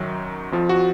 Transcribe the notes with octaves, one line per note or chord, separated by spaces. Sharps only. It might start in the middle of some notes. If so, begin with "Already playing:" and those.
Already playing: F#2 D#3 F#3
F2 F3
F#4